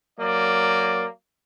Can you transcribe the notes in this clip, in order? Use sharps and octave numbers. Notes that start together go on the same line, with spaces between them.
F#3 A#3 D5